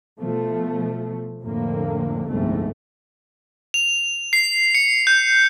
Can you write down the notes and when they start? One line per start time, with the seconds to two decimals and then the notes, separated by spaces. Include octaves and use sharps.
0.19 B2 F3 A3
1.41 F2 A2 D3 A#3
2.27 G1 C2 F2 G#2 A3
3.74 F7
4.33 C7
4.75 C#7
5.07 G6